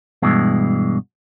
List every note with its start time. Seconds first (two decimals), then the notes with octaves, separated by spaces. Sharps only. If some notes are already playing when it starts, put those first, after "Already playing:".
0.22 G2 B2 E3 G#3